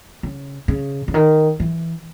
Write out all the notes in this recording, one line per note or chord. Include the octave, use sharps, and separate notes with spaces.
C#3
C#3
C#3
D#3
E3